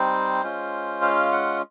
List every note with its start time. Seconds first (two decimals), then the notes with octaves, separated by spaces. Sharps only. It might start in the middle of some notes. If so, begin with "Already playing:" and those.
Already playing: G3 C4 D#4 C5
0.43 G#3 C#4 F4
1.02 F5
1.32 F#5